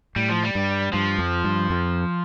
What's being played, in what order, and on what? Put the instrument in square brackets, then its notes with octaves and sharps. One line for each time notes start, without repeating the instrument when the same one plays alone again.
[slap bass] A2 [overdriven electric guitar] G3
[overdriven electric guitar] F3
G3
[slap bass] G2
[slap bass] G2 [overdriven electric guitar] F3
[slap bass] F2
G2
F2